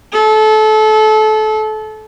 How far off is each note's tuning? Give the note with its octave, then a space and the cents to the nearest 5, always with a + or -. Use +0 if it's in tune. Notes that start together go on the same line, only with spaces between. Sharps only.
A4 -25